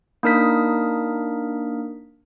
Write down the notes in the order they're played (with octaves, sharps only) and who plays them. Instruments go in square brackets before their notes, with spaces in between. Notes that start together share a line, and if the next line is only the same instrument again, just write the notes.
[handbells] A#3 D4 D#4 A#4 D#6 B6